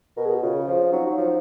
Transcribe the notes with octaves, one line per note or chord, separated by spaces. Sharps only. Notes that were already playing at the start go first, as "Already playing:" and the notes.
B2 A#4
G#4
F#4
C#3 F4
F3
C#4
F#3 D#4
F#3
F3